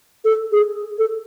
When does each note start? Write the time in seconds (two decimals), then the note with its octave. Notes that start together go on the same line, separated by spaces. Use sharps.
0.25 A4
0.52 G#4
0.99 A4